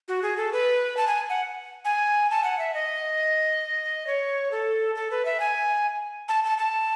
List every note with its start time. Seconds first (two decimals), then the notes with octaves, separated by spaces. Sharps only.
0.08 F#4
0.22 G#4
0.37 A4
0.52 B4
0.97 A5
1.07 G#5
1.30 F#5
1.85 G#5
2.30 A5
2.44 F#5
2.59 E5
2.74 D#5
4.07 C#5
4.51 A4
4.95 A4
5.11 B4
5.25 E5
5.40 G#5
6.29 A5
6.44 A5
6.58 A5